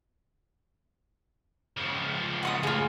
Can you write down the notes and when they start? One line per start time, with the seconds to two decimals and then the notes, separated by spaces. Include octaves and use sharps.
1.77 C#3 F3
2.43 F#5 C6 D#6
2.63 C#2 A2 F4 G#4